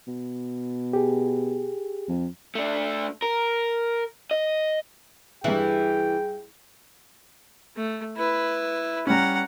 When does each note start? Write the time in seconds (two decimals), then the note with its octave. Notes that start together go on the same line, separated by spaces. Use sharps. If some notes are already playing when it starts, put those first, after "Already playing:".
0.07 B2
0.93 G4 G#4
2.08 F2
2.55 A3 D4
3.22 A#4
4.31 D#5
5.44 G2 E3 G#4 E5 G5
7.76 A3
8.16 E4 B4
9.07 G3 C#4 F#5 A#5